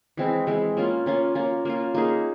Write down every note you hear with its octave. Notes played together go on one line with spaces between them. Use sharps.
E3 G#3 C4 E4
E3 G#3 C4 E4
A#3 C#4 F4
A#3 C#4 F4
A#3 C#4 F4
A#3 C#4 F4
A#3 D#4 G#4